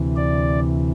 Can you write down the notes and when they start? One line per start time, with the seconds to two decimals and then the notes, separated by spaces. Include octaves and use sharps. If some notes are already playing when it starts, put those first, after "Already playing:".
Already playing: D2 C3 E3
0.16 D5